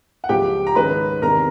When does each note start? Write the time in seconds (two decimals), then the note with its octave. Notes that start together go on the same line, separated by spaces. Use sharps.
0.24 F#5
0.29 C#2 C#3 F3 G4 G5
0.67 A#5
0.75 G#2 D#3 G#3 C#4 B4 B5
1.22 E2 C3 D#3 A#4 A#5